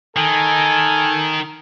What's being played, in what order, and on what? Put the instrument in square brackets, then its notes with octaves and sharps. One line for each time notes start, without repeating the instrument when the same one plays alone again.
[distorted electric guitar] D#3 [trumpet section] A4 G#5